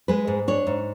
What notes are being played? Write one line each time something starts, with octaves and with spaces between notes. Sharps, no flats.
G#3 B4
G#2
D4 C#5
G#2